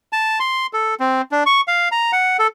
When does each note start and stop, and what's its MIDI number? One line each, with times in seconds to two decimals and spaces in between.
0.13 0.39 81
0.40 0.67 84
0.73 0.95 69
1.00 1.22 60
1.32 1.44 62
1.46 1.61 85
1.68 1.88 77
1.92 2.12 82
2.13 2.37 78
2.39 2.47 69